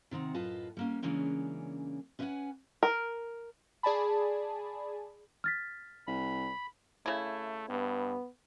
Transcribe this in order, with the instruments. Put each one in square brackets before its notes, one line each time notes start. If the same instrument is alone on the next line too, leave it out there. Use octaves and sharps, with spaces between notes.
[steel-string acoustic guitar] C3 D#3 C4 F#5
F#2 A2 F4 B4 D#5 A5
G3 A#3 C#4
C#3 E3 G#3 A#3 C#4 D4
C#4 B4 D#5 F5 F#5 G#5
[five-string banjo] A#4
[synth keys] G#4 D5 G#5 A5 B5
[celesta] F6 A6 B6
[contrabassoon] C2 [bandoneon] B5
[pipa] C#3 E4 [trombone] A3
[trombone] G2 [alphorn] B3